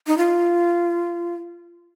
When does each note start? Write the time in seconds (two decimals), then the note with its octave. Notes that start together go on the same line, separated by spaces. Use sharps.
0.07 D#4
0.18 F4